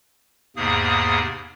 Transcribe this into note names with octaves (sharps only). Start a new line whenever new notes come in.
E2 G#2 C3 A#3 G#4 D#6